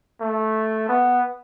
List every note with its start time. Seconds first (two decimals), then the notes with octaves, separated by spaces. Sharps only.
0.21 A3
0.89 B3